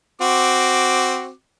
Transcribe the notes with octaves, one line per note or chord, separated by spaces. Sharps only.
C4 F#4 D6